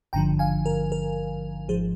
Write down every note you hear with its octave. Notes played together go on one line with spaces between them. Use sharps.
G#1 G2 D3 F3 G5 A#5
F5 G#5
A#4
A#4
G#1 G#2 F3 G#4 C5